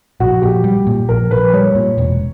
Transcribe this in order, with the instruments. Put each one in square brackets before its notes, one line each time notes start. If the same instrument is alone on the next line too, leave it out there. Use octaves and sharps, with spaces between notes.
[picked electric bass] A#1 [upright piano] F#4
[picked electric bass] A#1 [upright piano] G4
[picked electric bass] G3
A#2
[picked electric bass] A#1 [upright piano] A#4
[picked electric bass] A#1 [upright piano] B4
[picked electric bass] G3 [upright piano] C#5
[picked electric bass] A#2
E1